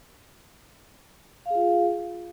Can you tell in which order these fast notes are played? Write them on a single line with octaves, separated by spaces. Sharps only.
F5 G#4 F4